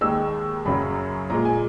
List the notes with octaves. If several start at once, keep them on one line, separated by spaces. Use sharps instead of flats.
D#2 D#3 G#3 E6
F#2 C#3 F#3 B5
A#2 G#3 A#5
G#5